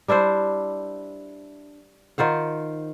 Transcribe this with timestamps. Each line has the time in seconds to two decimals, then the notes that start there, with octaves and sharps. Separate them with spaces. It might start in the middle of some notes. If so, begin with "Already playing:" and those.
0.08 G3 D4 E4 C5
2.18 D#3 F4 C5 F#5